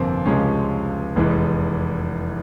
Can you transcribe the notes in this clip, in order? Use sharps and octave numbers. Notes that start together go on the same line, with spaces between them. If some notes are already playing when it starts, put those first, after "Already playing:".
Already playing: G1 F2 C3 A#3 C4
C#2 C3 F3 G#3 C#4
F1 E2 E3 G#3